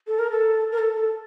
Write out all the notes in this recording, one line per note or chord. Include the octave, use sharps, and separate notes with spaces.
A4
A#4
A4
A#4
A4
A4